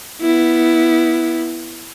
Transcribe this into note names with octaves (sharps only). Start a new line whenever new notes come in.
B3 E4